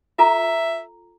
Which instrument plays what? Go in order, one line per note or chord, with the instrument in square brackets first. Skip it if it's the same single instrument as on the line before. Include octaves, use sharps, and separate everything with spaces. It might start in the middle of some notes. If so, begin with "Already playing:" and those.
[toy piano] F4 A4 A#5 [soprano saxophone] E5